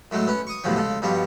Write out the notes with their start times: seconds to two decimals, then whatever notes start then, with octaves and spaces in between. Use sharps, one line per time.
0.11 A2 F#3 G#3 A3
0.27 B3 C#4
0.47 C#6 D#6
0.64 E2 A2 C3 F3 F#3
0.76 C#3 G#3 A4
1.02 G2 B2 F3 G3 C#5